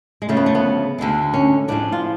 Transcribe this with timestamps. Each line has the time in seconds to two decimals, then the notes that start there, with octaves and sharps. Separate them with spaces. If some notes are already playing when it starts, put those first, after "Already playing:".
0.22 G#3
0.29 D2 C#3 F3 A3
0.37 B3
0.46 A3
0.55 B3
0.98 D2 D3 G#3
1.34 C#4
1.68 A2 F3 G#3 D4
1.92 F4